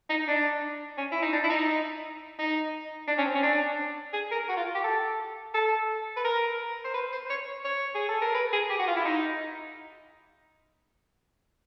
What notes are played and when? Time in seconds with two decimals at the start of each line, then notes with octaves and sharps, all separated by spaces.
0.09 D#4
0.28 D4
0.98 C#4
1.12 E4
1.22 D#4
1.33 D4
1.44 E4
1.50 D#4
2.39 D#4
3.08 D4
3.18 C#4
3.25 C4
3.35 C#4
3.43 D4
4.13 G#4
4.31 A#4
4.49 F#4
4.57 F4
4.75 G4
4.84 A4
5.54 A4
6.17 B4
6.24 A#4
6.84 C5
6.94 B4
7.12 C5
7.30 C#5
7.65 C#5
7.95 G#4
8.09 A4
8.22 A#4
8.34 B4
8.53 G#4
8.70 G4
8.79 F#4
8.87 F4
8.96 E4
9.05 D#4